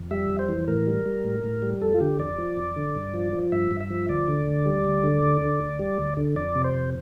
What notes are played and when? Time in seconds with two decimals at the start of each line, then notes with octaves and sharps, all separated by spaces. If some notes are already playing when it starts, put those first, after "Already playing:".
Already playing: F2
0.11 G3 E5
0.30 F2
0.39 C5
0.49 E3
0.68 A2 A#4
0.87 G3
1.06 G3
1.24 A2
1.44 A2
1.62 G3
1.81 F2 A4
1.94 F4
2.00 D3 G4
2.19 F2 D5
2.38 F3
2.57 F2
2.76 D3
2.95 G2
3.14 F3
3.33 F3
3.52 G2 E5
3.71 G2
3.80 E5
3.90 F3
4.09 D2 D5
4.28 D3
4.47 D2
4.66 G3
4.85 D2
5.03 D3
5.23 D2
5.41 D3
5.61 D2
5.79 G3
5.98 D2
6.17 D3
6.36 F2 D5
6.55 C3
6.64 C5
6.74 F2